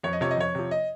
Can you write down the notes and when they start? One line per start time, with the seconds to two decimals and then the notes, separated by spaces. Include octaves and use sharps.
0.03 F2 C#5
0.13 D#5
0.21 C3 F3 C#5
0.31 D#5
0.37 F2 C#5
0.55 C3 F3
0.71 D#5